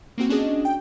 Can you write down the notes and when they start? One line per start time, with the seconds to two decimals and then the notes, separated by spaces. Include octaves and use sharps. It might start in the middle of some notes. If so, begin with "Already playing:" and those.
0.18 A#3 C4 F#4
0.29 C#4 D4 F#4 G#4 D#5
0.65 G5